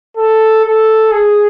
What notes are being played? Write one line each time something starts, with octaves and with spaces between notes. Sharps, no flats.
A4
A4
G#4